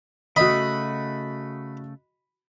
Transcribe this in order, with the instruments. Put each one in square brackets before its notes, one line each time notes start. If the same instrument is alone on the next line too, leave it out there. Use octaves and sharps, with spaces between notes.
[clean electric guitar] C#3 A3 [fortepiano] F#4 D#5 [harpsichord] B5